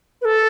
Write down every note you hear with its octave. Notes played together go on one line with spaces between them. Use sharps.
B4
A4